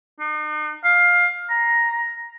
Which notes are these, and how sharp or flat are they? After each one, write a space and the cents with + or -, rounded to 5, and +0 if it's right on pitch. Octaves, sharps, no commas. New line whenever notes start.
D#4 -40
F5 +15
A#5 +5